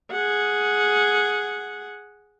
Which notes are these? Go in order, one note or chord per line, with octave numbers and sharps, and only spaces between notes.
G#4 F#5